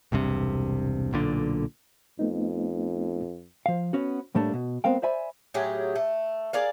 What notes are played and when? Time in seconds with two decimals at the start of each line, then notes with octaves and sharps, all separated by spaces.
0.12 E1 C2 G2 C3
1.13 B1 A#2 D3
2.19 F2 A3 B3 D#4
3.66 F3 F5
3.93 B3 C#4 F#4
4.35 A2 G3 A3 A#3 D4
4.54 B2
4.84 G#3 B3 C4 A#4 F5 G5
5.02 C5 D5 E5 G#5 B5
5.54 A2 F#3 G4 G#4
5.95 A3
6.53 G#4 A#4 D5 F5